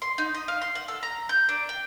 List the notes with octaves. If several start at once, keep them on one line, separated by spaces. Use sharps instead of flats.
C6
D#4
D#5
F5
C6
F#5
A4
A#5
G6
D4
G5